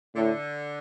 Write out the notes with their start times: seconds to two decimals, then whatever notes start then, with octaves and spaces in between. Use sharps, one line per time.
0.15 A2 D3